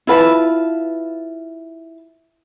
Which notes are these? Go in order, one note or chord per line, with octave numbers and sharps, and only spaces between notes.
E4 F4 B4 A5